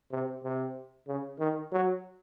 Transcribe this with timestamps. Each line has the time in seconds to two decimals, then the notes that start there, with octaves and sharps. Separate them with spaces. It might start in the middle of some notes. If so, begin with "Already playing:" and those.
0.11 C3
0.44 C3
1.08 C#3
1.39 D#3
1.72 F#3